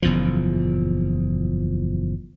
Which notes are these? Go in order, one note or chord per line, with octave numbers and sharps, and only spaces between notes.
F#1 E2 A#2 F3